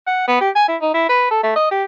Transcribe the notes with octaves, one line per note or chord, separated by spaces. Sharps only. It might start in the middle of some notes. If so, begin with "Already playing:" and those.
F#5
B3
G4
G#5
E4
D#4
E4
B4
A4
A3
D#5
G4